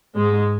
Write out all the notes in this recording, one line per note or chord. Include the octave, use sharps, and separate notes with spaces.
G#2 G#3